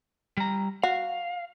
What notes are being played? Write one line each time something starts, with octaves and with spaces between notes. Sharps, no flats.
G3 A#5
F#4 F5